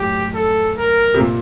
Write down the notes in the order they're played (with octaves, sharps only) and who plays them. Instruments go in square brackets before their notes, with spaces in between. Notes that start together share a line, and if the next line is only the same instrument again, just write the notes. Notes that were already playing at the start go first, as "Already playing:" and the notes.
Already playing: [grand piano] F#2 A2 [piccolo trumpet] G4
[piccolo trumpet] A4
A#4
[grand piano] C3
A#2